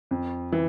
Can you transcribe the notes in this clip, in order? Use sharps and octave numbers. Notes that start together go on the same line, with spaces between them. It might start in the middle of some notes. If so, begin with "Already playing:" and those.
F2
E3